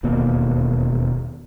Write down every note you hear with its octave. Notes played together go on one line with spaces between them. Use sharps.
E1 D#2 B2 A#3